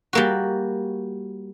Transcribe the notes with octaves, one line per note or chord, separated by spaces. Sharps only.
G3 A#3 F#4